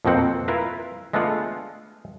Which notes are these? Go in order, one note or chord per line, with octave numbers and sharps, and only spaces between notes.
F2 B2 A#3 C4 F#5
E4 F4 A#4 B4
G#3 A3 B3 D4 F4 F#5